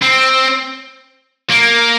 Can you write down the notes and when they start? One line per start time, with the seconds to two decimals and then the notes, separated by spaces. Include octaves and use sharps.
0.02 C4
1.50 A#3